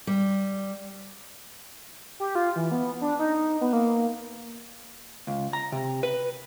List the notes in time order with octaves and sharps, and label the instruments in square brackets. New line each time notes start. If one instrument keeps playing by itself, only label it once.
[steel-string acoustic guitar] G3
[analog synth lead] G4
F4
E3
B3
D4
D#4
B3
A#3
[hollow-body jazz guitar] C#2
A#5
C3
B4